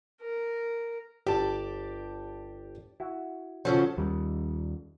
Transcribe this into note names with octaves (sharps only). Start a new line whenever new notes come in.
A#4
G1 G4 D5 A5
E4 F#4
C#3 F3 F#3 C#4 A4 C5
D#2 G3